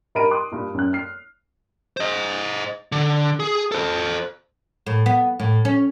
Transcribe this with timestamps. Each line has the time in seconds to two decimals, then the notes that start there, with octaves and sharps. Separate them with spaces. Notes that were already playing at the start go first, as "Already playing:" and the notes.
0.15 G2 D#4 A#4 B5 D7 D#7
0.31 C6 D6 D#6 F#6
0.52 G2 A#2
0.74 F#2 F#6
0.93 F6 C7
1.97 C5 D#5
2.92 D3
3.40 G#4
3.72 A4 C5
4.86 A2
5.06 B3
5.40 A2
5.65 C#4